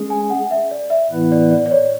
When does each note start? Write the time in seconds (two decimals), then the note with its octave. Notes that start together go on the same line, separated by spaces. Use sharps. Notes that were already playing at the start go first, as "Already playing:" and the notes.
Already playing: G#3 C#4 G#4
0.10 G#5
0.30 F#5
0.51 E5
0.71 D5
0.90 E5
1.11 A2 E3 B3 E4 B4
1.32 D5
1.51 D5
1.66 D5
1.71 C#5